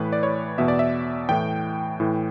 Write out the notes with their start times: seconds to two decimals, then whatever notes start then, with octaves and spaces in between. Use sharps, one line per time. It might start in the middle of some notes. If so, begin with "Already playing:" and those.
Already playing: A2 E3 B4
0.12 D5
0.23 C#5
0.58 E2 B2 E5
0.68 D5
0.79 E5
1.29 A2 E3 G5
2.00 A2 E3